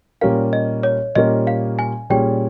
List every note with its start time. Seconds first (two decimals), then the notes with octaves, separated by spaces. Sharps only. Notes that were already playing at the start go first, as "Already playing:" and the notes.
0.21 A#2 G3 C#4 G4 A#4 F5
0.53 D#5
0.83 C#5
1.15 A#2 G3 C#4 G4 A#4 D#5
1.47 F5
1.79 G#5
2.10 A#2 G3 C#4 G#4 C#5 G5